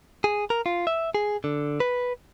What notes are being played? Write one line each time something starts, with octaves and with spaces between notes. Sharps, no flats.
G#4
A#4
F4
E5
G#4
D3
B4